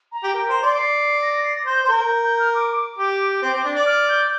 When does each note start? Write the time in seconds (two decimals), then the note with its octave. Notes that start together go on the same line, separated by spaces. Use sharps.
0.12 A#5
0.23 G4
0.34 A#4 G5
0.48 C5 A#5
0.63 D5 C6
0.77 C7
1.22 A#6
1.33 A#6
1.44 C7
1.55 A#6
1.66 C5 G6
1.84 C5
1.88 A#4
2.25 G6
2.39 F6
2.54 D6
2.76 D6
2.98 G4
3.42 C4
3.53 C4
3.64 D4
3.76 D5
3.86 F6
4.09 G6